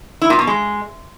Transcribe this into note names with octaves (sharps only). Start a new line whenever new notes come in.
E4
A#2
B2
G#3